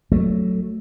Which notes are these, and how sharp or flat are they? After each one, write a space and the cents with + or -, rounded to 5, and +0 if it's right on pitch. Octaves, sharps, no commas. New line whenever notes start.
F#3 +0 A3 +0